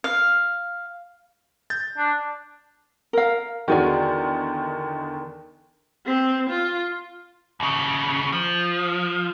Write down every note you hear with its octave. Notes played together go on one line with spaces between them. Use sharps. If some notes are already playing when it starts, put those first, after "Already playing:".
F5
G6 A6
D4
A#4 F5
E2 D3 D#3 F#4 G#4 D5
C4
F4
D#2 C#3
F3